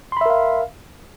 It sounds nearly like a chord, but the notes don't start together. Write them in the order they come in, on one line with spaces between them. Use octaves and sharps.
C6 B5 E5 A#4 F5